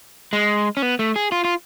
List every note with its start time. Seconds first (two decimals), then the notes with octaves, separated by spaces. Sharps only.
0.33 G#3
0.77 C#4
0.82 B3
0.99 A3
1.16 G#4
1.32 F4
1.44 F4